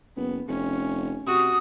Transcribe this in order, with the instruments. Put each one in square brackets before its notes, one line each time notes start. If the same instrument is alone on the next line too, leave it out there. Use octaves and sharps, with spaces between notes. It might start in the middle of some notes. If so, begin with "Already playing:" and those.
[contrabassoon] F#1 [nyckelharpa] B3
[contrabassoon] F1 [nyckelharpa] C#4
[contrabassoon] C3 [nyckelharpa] F#4 [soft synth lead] D#6